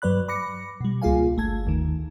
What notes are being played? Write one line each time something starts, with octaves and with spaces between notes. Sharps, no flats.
G2 F#3 B4 D5 B5 F#6
B5 D6 A#6 C#7
B2 G3
C#2 A#3 F4 G#4 F5 G#5
G1 A3 A5 G#6
D#2 D#3